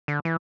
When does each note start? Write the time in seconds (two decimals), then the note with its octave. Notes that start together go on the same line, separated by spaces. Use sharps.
0.08 D3
0.25 E3